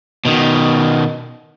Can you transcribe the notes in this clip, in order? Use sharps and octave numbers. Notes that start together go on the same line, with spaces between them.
B2 D#3